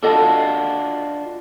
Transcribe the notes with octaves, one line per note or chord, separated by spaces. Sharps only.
D4 F4 F#4 A4 D#5 A5